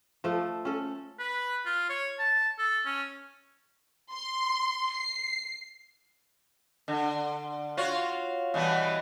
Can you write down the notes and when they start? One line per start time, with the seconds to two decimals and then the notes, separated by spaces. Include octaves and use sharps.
0.24 F3 A3
0.65 C#4 A4
1.19 B4
1.65 F4
1.90 C#5
2.19 A5
2.59 A4
2.86 C#4
4.13 C6
4.92 C7
6.88 D3
7.77 F4 F#4 C#5
8.54 B2 E3 G3